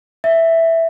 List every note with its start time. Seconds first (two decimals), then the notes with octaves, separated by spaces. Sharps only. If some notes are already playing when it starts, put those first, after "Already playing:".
0.24 E5